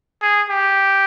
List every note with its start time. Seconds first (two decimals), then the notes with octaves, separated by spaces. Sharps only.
0.22 G#4
0.50 G4